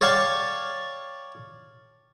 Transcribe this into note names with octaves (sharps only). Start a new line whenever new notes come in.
C#5 D5 F5 G5 A5 C#6